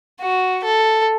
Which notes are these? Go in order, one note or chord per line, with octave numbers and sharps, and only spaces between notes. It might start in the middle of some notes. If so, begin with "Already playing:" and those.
F#4
A4